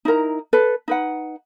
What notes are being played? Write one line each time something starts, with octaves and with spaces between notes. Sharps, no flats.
D#4 E4 A#4 A#5
A4 B4
D#4 B4 F#5